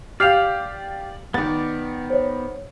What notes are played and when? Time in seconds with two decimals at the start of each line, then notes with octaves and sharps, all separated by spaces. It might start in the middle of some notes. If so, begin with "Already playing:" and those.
0.20 G4 D5 F5 F6 C7 F7
1.34 D#3 B3 D5 A6
2.10 C5 C#5